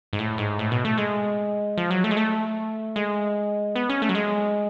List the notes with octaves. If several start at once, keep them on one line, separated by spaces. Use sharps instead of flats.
G#2
A2
G#2
A2
B2
A3
G#3
F3
F#3
A3
G#3
A3
G#3
B3
C#4
A3
F#3
G#3